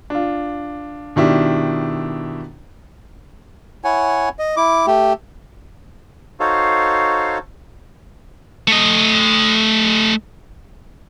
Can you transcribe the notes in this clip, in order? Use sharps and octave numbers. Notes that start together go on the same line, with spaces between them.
D4 F4
B2 D#3 D4 E4 G4
E4 C#5 F#5 G#5
D#5
E4 D6
A3 G4
D#4 F#4 A4 C5 C#5 F5
A3 D#5